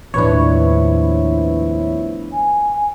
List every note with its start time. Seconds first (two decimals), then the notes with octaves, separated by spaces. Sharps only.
0.14 D#2 A2 F3 B3 D4 E4 B4 C#5
2.33 G#5